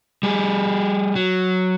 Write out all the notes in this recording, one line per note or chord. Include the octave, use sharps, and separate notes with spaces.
G3 G#4
F#3